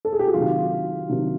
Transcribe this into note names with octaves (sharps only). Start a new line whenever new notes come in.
A4
G#4
G4
F#4
C3 D#3 F#3 F4
C3 D#3 F#3